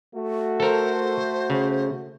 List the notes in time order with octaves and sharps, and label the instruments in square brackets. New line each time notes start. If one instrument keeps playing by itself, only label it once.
[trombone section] A3 F#4
[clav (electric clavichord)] A4 A#4 [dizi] C5
[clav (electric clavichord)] C#3